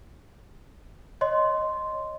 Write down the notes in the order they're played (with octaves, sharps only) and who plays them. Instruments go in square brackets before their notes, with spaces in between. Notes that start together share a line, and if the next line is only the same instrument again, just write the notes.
[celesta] C#5 D#5 C6